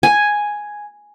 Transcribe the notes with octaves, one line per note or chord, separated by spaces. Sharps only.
G#5